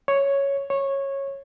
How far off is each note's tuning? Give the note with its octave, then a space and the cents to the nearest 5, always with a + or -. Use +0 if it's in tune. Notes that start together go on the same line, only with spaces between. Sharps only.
C#5 +0
C#5 -15